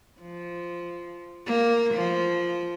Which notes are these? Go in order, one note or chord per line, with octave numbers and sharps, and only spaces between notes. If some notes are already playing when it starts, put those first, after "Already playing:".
F3
A#3
F3